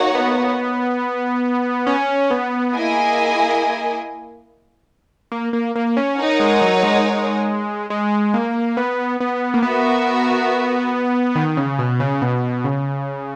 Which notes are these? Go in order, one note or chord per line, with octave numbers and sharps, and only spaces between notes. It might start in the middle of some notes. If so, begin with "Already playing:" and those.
Already playing: A#3 D#4 F#4 C#5 F#5
B3
C#4
B3
A#3 E4 G#4 D#5 G#5
A#3
A#3
A#3
C#4
D#4 A#4 C#5 F#5
G#3
F#3
G#3
G#3
A#3
B3
B3
A#3
B3 F#4 A#4 E5
D#3
C#3
B2
C#3
B2
C#3